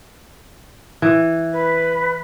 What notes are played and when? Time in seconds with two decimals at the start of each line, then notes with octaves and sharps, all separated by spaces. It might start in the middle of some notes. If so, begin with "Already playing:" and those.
1.02 E3
1.53 B4